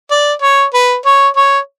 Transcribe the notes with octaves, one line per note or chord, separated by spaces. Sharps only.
D5
C#5
B4
C#5
C#5